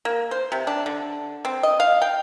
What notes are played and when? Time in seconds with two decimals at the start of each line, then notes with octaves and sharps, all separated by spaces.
0.05 A#3
0.31 C5
0.52 C3
0.67 D4
0.86 D3
1.45 C4
1.63 D#5
1.80 F5
2.02 G5